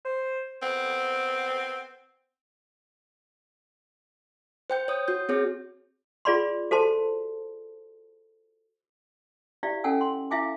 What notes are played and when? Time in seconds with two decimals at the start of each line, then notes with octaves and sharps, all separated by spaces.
0.05 C5
0.62 B3 C4
4.70 C5 G5 G6
4.88 C#5 D#6
5.08 F#4 G6
5.29 C4 G#4 C#5
6.25 F4 G#4 D5 B5 C6
6.71 F#4 A4 C5 A5 C6
9.63 E4 G4 D5 E5 F5
9.84 C#4 A4 F#5 G#5 E6
10.01 C6
10.31 E4 E5 F5 G#5 D6